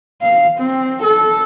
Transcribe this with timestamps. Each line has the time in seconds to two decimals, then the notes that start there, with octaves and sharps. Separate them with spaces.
0.22 F5
0.58 C4
1.03 A4